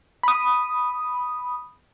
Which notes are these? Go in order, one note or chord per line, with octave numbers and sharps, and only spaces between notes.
B5 D#6